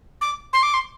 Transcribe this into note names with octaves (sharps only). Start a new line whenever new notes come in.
D6
C6
D6
C6